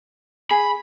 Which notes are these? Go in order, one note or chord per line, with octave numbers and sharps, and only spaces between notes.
G#4 B5